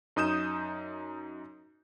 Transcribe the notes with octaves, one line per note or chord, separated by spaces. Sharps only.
F#2 D#4 D#6 G6 E7